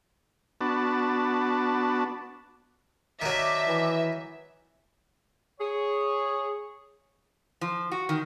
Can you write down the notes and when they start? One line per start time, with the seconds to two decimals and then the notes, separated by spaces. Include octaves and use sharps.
0.61 B3 D4 F#4 A5
3.22 D#3 F#3 D5 E5 A5 D6
3.68 E3
5.60 G#4 C#5
7.61 F3
7.92 F#4
8.09 D#3